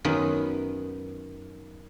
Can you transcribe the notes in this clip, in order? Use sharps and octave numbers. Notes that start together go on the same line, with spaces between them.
F#2 D#3 B3